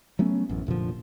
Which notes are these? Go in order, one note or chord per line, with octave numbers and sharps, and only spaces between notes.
F#3 A3 B3 C#4
A1 F#2
F1 A#2 D3 F3